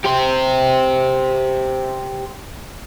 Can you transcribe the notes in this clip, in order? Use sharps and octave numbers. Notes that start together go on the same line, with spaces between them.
G4 C5